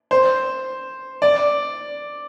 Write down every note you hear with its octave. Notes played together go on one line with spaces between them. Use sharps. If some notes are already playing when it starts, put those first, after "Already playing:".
C5
D5